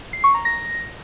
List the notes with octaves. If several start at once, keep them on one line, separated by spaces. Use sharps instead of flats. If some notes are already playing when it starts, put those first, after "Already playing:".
C7
C#6
A#5
A#6